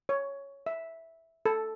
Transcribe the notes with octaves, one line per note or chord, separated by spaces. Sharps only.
C#5
E5
A4